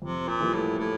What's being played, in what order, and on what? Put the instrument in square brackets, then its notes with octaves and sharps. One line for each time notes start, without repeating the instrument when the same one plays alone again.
[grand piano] F2 [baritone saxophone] C3
[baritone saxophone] A#2
[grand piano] E3 G3 A#3 F4
[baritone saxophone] A2
A2